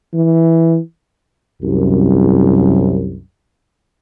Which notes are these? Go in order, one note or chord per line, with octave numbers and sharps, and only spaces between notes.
E3
C2 F#2